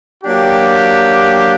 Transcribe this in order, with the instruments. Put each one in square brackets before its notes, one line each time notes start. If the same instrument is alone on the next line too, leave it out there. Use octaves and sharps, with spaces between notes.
[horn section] F#3 A#3 D4 G4